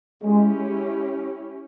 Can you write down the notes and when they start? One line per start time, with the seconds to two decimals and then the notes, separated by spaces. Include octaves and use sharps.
0.24 G#3 C#4 E4 G4